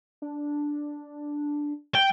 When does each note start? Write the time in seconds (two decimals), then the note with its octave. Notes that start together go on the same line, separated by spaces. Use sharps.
0.22 D4
1.95 G5